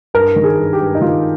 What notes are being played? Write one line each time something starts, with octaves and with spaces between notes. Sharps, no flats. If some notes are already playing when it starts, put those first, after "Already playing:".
G2 A#4
D#3
G#4
G2
G4
G2
D#4
D#3 F4